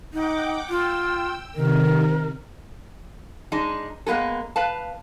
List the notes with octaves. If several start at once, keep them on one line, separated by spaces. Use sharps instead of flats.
D#4 F#5 G5 D6
F4 G5 E6
C3 D#3 A#4
G#3 D4 D#4
G#3 A#3 B3 G#4 A4
B4 F5 A5